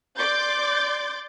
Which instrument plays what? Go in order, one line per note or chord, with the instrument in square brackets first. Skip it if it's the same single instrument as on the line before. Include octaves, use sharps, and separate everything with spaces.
[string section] D5 C6 D6 G6 A6